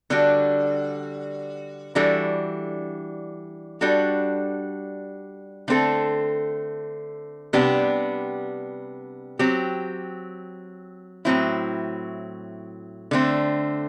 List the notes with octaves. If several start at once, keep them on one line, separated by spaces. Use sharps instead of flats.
D3 G3 D4 F#4
E3 G3 D4 F#4 A4
G3 D4 F#4 A4
D3 A3 C4 E4 A4
C3 G3 B3 D4 G4
F#3 C4 G4
A2 F#3 C4 E4
D3 A3 C4